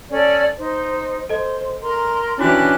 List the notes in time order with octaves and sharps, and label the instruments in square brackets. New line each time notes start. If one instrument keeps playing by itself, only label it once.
[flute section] C#4 A4 D5
D#4 C5
[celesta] A4 D#5 [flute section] C5
[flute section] A#4 A#5 C6
[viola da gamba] E3 D4 [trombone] C#4 [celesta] E4 F#4 C#5 [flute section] G4 F#6